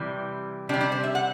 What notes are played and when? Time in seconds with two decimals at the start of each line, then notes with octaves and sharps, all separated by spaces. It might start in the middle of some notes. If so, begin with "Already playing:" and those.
Already playing: C3 E3 G3
0.69 C3 D4
0.74 G3
0.81 D4
0.92 C5
1.03 E5
1.15 F#5